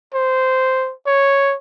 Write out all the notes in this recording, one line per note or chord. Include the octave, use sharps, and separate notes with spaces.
C5
C#5